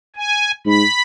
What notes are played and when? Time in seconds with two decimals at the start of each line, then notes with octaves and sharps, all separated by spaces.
0.16 G#5
0.66 G#2 B5